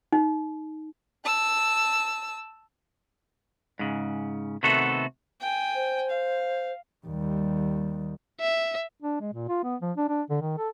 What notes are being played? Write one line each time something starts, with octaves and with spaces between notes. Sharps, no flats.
D#4
A5 E6
G#2 C#3
C3 D#3 A3 B3 F#4 A4
G5 G#5
C5
F5
D#2 G3
E5
D4
G#3
A#2
F4
B3
F3
D4
D4
D3
D#3
A4